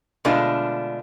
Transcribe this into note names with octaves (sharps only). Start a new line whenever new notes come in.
B2 D3 G#3 A3 D4 F4